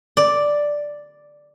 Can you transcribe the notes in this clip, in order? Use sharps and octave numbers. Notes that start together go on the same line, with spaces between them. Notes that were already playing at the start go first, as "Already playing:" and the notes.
D5